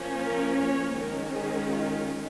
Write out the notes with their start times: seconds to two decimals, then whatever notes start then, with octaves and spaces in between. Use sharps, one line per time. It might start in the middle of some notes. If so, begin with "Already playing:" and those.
Already playing: F3 A#3 C#4
0.27 A#4
0.63 C#5
0.98 D#3 G#3 C#4 A#4
1.33 G#4
1.70 F4